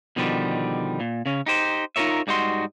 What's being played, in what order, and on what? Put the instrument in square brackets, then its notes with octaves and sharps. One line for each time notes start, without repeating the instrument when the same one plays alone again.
[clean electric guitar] B2 D3 D#3 F3 G3
A#2
C#3 C#4
D#4 G4 C5
D#4 F4 G4 A#4 C#5 E5
G#2 G3 D#4 F#4 C6